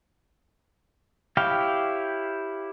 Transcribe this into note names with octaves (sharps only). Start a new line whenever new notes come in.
E4 G4 C#5 F5 G5